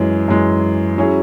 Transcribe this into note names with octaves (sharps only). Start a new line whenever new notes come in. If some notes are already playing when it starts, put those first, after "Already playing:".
Already playing: F#2 E3 G#3
F#2 E3 G#3
F#3 C#4 E4 G#4